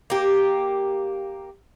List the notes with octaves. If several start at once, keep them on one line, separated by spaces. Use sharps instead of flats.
A#3 G4